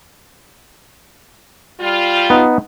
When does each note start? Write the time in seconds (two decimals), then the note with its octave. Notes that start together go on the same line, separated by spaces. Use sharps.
1.80 G3 F4
2.30 B3 D#4